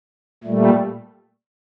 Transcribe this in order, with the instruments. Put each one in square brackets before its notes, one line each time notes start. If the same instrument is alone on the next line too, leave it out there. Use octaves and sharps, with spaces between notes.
[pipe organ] A#2 G3 A3